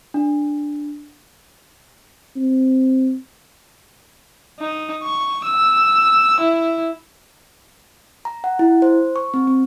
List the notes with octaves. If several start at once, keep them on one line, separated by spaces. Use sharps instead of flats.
D4
C4
D#4
C#6
E6
E4
A#5
F#5
E4
C5
C#6
C4
C4